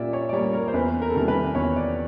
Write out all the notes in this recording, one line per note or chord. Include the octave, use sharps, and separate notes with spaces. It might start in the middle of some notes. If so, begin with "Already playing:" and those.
Already playing: A#2 G3 A#3 D5 E5
C#5
D5
G3 A#3 C#5
A#4
C5
E2 B4
A#4
A4
C3 D#3 G3 A#3 A#4
B4
E2 C#5
D5